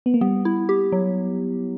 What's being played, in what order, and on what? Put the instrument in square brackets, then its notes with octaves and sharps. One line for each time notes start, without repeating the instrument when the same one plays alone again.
[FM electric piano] B3
A#3
[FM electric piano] G3 [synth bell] B3
[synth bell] E4
G4
F#3